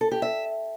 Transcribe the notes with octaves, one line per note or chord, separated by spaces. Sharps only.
A4
G4
E5